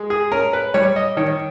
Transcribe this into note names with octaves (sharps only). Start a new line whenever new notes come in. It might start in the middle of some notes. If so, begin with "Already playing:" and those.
Already playing: G#3
G#4
C#4 A#4
B4
G3 C#5
D#5
D#3 C#5